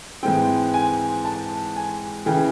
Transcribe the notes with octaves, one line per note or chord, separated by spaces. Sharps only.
G#2 E3 G#3 C4 G5
G#5
A5
G#5
C#3 E3 G5